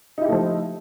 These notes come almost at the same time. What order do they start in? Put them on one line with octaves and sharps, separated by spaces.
D#4 E4 G4 A3 F3